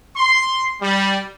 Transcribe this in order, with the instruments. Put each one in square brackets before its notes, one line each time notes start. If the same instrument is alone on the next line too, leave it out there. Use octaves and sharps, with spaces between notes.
[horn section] C6
G3